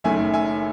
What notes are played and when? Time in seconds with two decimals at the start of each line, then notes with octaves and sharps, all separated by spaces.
0.04 F#1 F#2 D#3 A3 E5 G#5
0.34 E5 G#5